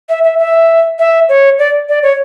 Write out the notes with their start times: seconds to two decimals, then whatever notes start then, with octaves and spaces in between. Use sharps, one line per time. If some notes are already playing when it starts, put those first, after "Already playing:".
0.09 E5
0.24 E5
0.39 E5
0.99 E5
1.29 C#5
1.59 D5
1.89 D5
2.03 C#5